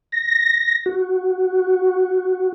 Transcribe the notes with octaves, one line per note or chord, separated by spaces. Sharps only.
A#6
F#4